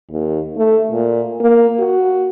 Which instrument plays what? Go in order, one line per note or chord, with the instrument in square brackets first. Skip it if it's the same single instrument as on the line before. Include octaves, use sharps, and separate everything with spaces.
[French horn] D#2
A3
A#2
A#3
F#4